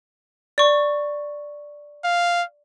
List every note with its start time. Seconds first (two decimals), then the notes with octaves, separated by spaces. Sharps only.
0.58 D5 C#6
2.04 F5